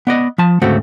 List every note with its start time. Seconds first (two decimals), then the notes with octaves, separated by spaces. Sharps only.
0.07 B3 D5 D#5
0.38 F3 A5
0.62 D2 G#2 C#3 A3 C4 F#4